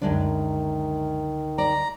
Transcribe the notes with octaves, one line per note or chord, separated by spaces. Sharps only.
C#2 F#2 D3 D#3 G#3 D4
D5 A#5